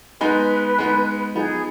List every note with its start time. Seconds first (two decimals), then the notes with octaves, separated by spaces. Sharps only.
0.21 G#3 B3 D#4 B4
0.78 G#3 B3 D#4
1.35 F3 B3 D#4 G#4